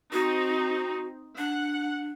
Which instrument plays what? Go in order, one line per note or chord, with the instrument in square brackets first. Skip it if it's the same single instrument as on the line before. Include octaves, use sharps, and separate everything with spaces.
[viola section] C4 D#4 [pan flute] F#4
[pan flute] D4 [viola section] F#5